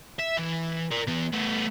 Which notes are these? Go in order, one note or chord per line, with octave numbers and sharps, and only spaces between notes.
E5
E3
A#4 D5
E3 B3
A3 B3